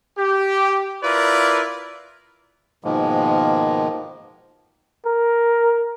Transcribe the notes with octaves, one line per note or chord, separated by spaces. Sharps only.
G4
E4 F4 A#4 B4 D5
G#2 B2 D#3 F3 G#3 A#3
A#4